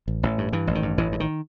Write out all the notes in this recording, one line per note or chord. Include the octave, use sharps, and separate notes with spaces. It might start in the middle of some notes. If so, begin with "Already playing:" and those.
A1
A1
G2
G2 E3
A1
D#3
G2
A1 E3
G2
D#3